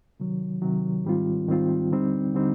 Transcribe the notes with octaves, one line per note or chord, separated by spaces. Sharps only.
C3 D#3 F#3
C3 D#3 F#3
G#2 D#3 G3 C4 F4
G#2 D#3 G3 C4 F4
D#2 D3 G3 C4 D#4
D3 G3 C4 D#4